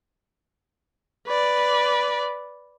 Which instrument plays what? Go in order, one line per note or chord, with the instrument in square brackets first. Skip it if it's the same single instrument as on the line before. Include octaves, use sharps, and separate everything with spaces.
[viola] B4 D5